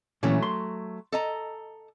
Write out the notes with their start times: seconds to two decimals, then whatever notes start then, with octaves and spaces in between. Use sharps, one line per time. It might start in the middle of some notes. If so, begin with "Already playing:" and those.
0.23 A#2 E3 F#3 A3 C#4
0.43 C6
1.12 A4 D#5 A#5